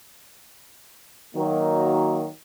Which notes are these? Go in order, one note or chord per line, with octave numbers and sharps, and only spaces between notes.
D#3 F#3 A#3